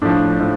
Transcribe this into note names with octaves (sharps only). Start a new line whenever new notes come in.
A2 F3 D4
A2 F3